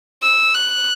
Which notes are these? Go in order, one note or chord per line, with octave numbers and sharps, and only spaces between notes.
E6
F#6